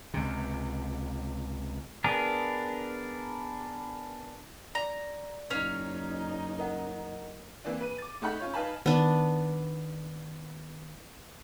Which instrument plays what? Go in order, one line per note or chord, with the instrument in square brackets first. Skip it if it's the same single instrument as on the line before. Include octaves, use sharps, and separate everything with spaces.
[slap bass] C#2 C3
[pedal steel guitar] B3 D4 G#4 A#4
[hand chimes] D5 [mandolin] A#5
[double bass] F#1 D#4 [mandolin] C#4 C#5 F5
[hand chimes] A#4 D#5 F#5
[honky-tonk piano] E3 A#3 C4 D4
B4 D#7
D6 A6
A3 D#4 F#5 B5 G6
C#4 F4 C#5
D#4 B4 F5 G#5 A5 B5
[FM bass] D#3 [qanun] B3 D4